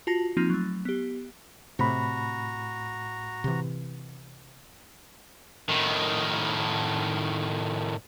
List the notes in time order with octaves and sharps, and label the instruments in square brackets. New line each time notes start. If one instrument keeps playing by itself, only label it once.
[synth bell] F4 F#4 A5 A#6
F3 A#3 C4 D#4 F4
F#3 A3
B3 G4
[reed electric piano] A2 B5 [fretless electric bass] C3 [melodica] F#4 A#5
[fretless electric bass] C3 E3
[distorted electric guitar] A2 D#3